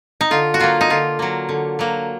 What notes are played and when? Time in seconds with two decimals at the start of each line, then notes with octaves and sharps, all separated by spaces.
0.21 D#4
0.31 D3 F4
0.54 F#4
0.60 F#3 A#3 F4
0.81 D#4
0.90 D3 F4
1.19 F#3 A#3
1.49 D3
1.79 F#3 A#3